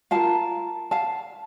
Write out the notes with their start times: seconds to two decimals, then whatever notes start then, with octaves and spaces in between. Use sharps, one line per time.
0.11 F4 A#4 F5 A5
0.91 F5 A5